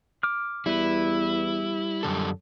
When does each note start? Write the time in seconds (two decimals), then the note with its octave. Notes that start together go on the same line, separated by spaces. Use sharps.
0.23 D6 F6
0.66 E2 G3 E4 B4
2.03 F#2 D3 A4